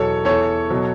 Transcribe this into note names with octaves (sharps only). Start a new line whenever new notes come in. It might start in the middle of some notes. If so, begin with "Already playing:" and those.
Already playing: E2 B2 F#3 A4 C#5
E2 E3 A4 C#5
B2 F#3